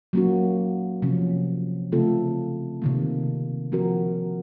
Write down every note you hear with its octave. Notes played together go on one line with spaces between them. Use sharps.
F#3 A#3 C#4 F#4
C3 F3 A#3 C#4
C#3 A3 C4 F4 A4
C3 D#3 A#3
F3 C4 F#4 A#4